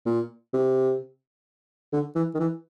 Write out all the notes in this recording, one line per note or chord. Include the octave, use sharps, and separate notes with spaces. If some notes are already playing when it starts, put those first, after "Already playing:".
A#2
C3
D3
E3
D#3
E3